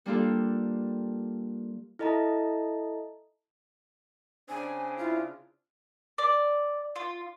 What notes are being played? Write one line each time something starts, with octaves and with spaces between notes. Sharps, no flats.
G3 A#3 D4 F4 G4 A4
E4 A4 D#5 A5 A#5
C#3 C4 D4 G#5
E4 F4
D5
F4